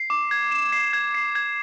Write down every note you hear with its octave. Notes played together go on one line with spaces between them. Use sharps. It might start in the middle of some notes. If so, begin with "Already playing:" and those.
Already playing: C7
D6
G#6
E7
C7
G#6
C7
G#6